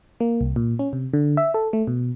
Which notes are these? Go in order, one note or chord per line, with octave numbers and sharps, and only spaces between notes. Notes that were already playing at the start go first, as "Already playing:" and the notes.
A#3
C2
A#2
C#4
C3
D3
E5
A4
A3
B2